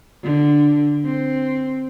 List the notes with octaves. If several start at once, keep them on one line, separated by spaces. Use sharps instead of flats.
D3
C4